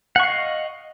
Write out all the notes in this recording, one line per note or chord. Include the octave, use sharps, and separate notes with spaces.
D#5 F5 F#5 C#6